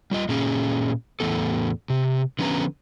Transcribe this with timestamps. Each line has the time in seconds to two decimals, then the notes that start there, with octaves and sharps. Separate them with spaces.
0.11 G3 F4 D#5
0.29 A#2 A#3 C#4 G#4
1.20 E2 A2 B3 A4
1.90 C3
2.39 D3 F3 B3 C#4 B4 A#5